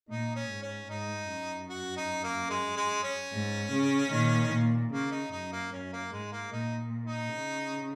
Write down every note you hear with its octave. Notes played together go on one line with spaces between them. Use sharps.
A#2 D#4
C#4
G#2
C#4
G#2 D#4
F#2
F#4
D#4
A#3
G#3
G#3
C#4
G#2
C#3
A#2 D#3
A#2
C#3 A#3
D#4
F#2 D#4
A#3
F#2 C#4
A#3
G#2 G#3
A#3
A#2 D#4
D#4
C#3